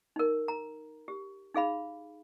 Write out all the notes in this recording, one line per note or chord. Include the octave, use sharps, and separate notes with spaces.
D#4 A#4
A#5
G4
D#4 G#4 F5 B5